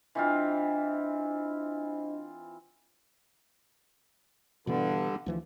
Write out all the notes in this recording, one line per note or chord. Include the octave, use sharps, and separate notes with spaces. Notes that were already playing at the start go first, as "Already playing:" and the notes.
E3 C4 D4 F4 C5 D#5
G2 B2 D3 E3 B3
D2 E3 F3